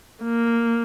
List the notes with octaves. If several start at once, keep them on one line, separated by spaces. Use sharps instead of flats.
A#3